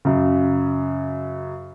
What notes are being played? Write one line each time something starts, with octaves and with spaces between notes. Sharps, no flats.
F#2 C#3